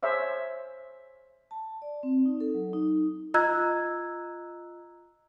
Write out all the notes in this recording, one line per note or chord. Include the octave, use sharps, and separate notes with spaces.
G#4 C5 C#5 E5 F5
A5
D5
C4
D#4
A4
F#3
D#4
F4 D#5 A#5 E6 F#6 G#6